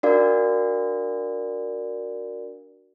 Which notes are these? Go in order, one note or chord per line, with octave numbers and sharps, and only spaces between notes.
D4 F#4 A#4 D5 F5